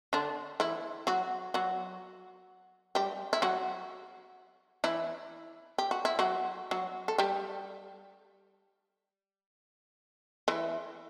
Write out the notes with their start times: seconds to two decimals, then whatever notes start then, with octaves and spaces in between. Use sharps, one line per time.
0.13 D3 D4
0.60 E3 E4
1.07 F#3 F#4
1.54 F#3 F#4
2.95 G3 G4
3.33 E4
3.42 F#3 F#4
4.84 E3 E4
5.78 G4
5.91 F#4
6.05 E4
6.19 F#3 F#4
6.71 F#3 F#4
7.08 A4
7.18 G3 G4
10.48 E3 E4